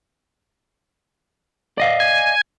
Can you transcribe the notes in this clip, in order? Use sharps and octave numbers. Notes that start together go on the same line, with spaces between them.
D5 D#5 F5
G#5